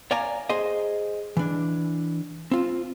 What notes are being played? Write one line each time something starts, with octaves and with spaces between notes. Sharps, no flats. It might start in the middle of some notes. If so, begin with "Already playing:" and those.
C#5 D5 F5 G#5 A#5
G#4 C5 D#5
E3 D4
C4 F4